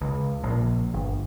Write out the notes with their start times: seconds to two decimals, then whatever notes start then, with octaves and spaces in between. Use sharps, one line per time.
0.01 C#2
0.43 A#1
0.94 G1